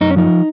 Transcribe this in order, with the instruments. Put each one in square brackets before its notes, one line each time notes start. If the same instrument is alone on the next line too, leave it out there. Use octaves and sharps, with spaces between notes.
[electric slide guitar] F#2 D#4
C#4
F3 D#4